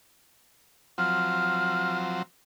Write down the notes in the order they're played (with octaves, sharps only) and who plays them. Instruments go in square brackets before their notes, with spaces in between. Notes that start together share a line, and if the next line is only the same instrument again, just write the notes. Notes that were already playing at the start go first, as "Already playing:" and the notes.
[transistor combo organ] F3 F#3 C4 [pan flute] F6